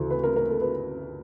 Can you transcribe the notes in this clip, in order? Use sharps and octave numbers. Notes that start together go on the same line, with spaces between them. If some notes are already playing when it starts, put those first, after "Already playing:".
Already playing: D2 C#3 E3
B4
A#4
A#4
A4
B4